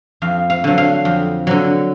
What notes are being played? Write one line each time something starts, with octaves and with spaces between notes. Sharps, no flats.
F2 F5
F5
D3 F#3
F5
F2
D3 F#3